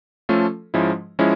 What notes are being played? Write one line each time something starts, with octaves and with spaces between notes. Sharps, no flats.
F3 A3 C#4 F4 A4
G#2 F3 G#3 C#4 E4
F3 G#3 C#4 E4